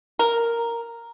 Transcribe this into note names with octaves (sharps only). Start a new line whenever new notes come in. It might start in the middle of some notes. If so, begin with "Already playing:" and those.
A#4